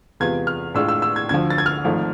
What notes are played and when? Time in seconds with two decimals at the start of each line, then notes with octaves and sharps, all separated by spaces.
0.20 E2 C3 G#3 B3 F4 G#6
0.47 F6
0.74 A2 G#3 D4 F4 E6
0.89 E6
1.02 E6
1.16 G#6
1.29 D2 D3 F3 G#6
1.50 A6
1.58 G#6
1.66 F6
1.84 G#1 G#2 F3 A3